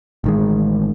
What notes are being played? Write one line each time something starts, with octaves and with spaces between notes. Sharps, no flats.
A1 D#3 G#3